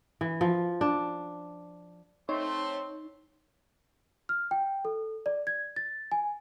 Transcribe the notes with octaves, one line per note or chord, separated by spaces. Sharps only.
E3
F3
D4
A3 C4 D#4 C#5 C6
F6
G5
A4
D5
G#6
A6
G#5